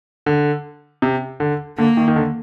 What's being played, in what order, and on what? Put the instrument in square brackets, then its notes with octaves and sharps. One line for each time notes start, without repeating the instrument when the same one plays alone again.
[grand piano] D3
C3
D3
[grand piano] D3 [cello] A#3
[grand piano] D#3
D#3
D3